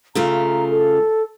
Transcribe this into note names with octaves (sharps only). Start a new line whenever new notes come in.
C#3 A3 F4 A#5
A4